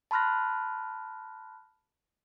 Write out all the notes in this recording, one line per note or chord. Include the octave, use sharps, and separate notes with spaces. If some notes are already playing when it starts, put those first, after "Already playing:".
A5 B5 C6 F6 F#6 A#6